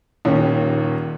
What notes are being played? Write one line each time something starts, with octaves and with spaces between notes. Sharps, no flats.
D#1 D#2 C#4